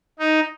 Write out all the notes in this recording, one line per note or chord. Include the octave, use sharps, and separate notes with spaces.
D#4